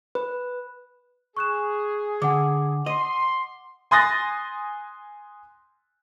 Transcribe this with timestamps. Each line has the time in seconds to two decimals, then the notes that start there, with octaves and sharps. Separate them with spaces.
0.15 B4
1.37 G#4 C#6 F#6 E7
2.22 D3 F#5 D6
2.86 D#5 C6
3.91 G#5 C6 D#6 F#6 A6 A#6